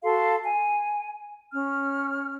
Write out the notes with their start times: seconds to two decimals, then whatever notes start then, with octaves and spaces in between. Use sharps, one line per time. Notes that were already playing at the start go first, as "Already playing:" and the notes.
0.03 F#4 A4 F5 C6
0.43 G#5
1.52 C#4 F6